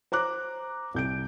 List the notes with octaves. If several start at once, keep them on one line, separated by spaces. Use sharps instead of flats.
C5 A#5 D6 F#6
C2 G6 D7